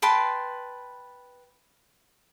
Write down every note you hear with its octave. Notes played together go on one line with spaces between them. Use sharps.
B4 G5 A5 C6